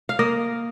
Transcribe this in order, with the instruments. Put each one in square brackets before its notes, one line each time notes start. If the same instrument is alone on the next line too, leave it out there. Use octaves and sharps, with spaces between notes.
[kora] F5
A#3 D#5